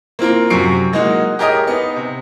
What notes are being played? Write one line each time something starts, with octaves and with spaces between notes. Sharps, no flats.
A#3 C4 F4 A#4
F#2 C3 F#3 C#6 C7 D7
F#3 G#3 A#3 D#4 F#4
G4 G#4 A#4 C#5 D#5 D#6
B3 D#4
C3